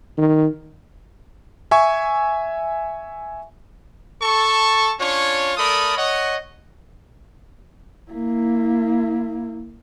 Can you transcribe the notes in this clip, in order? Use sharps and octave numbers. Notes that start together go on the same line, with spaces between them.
D#3
E5 G#5 C#6
A4 A5 C#6
C#4 D4 F4 C#5
A3 A4 A#4 D5 B5 D#6
C#5 D#5 F#5
A#3 E4